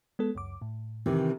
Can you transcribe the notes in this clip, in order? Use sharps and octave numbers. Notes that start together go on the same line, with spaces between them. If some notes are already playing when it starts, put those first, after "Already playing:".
G#3 B3 A4
C#2 F#2 D6
A2
C3 D#3 E3